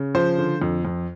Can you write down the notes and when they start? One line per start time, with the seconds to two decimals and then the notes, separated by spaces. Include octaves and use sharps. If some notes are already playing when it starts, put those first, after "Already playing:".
Already playing: C#3
0.15 F3 C5
0.38 D3
0.62 F2
0.85 F2